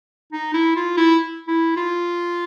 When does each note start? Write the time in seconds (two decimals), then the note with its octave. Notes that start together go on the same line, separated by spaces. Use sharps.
0.33 D#4
0.54 E4
0.76 F4
0.97 E4
1.47 E4
1.76 F4